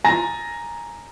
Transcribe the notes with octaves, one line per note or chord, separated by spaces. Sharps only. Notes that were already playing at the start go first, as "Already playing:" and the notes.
G#5 A#5 A6 A#6